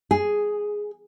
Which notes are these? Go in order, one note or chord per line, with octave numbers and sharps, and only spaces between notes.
G#4